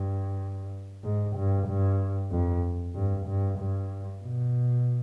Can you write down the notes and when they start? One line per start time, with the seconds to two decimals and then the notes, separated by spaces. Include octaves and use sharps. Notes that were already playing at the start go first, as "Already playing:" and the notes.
Already playing: G2
1.04 G#2
1.36 G2
1.68 G2
2.31 F2
2.95 G2
3.27 G2
3.59 G2
4.23 B2